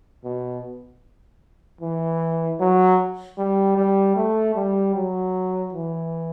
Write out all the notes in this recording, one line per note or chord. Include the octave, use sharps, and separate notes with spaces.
B2
E3
F#3
G3
G3
A3
G3
F#3
E3